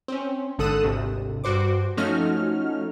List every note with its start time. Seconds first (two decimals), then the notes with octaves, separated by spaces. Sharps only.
0.08 C4 C#4
0.58 G#1 D3 A4 D#6 F#6 E7
0.83 G#1 D2 C3
1.44 G2 F#4 C5 D6
1.97 F3 A3 C#4 D#4 F#4 F6